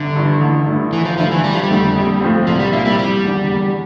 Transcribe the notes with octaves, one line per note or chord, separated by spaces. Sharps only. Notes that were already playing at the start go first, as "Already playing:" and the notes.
Already playing: G1 D3
G2 E3
A1
G2 E3 A3 E4
G1 E3
F3
G2 D3 F3 A3 E4
E3
G1 G3
F3
G3
F2 D3 A3 C4
A#1
A2 F3 C4
C2 F3
G3
A#2 F3 A#3 C4 E4
G3
E1 G3
E2 D3
E2